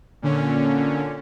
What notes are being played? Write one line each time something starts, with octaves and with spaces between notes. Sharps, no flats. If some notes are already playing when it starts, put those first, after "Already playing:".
A#2 D3 C#4